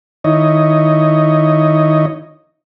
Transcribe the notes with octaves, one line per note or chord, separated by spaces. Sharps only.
D#3 D#4 E4 C#5 D#5